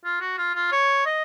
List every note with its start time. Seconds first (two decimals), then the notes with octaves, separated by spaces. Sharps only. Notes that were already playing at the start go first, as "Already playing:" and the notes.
0.04 F4
0.21 F#4
0.38 F4
0.55 F4
0.72 C#5
1.06 D#5